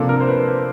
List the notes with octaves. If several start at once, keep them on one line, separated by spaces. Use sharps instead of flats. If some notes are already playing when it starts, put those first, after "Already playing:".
Already playing: C3 F3 A#3 D4 A4
A#4
C5
B4
C5